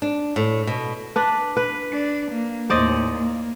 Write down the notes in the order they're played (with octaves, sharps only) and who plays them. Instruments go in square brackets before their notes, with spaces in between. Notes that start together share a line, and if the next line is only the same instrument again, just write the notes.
[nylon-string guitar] D4
A2
B2
[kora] D4 B4
B4
[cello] D4
A#3
[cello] D#2 A2 [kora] C5 D5 D#5
[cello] A#3